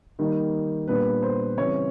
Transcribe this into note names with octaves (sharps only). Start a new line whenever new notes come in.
D#3 G3 A#3 D#4
A#2 G3 B3 D4 B4
C5
C#3 E3 G3 C4 C#5